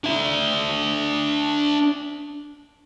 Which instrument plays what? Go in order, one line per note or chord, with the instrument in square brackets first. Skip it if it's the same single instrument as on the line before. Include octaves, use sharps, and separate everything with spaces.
[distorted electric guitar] D4 E5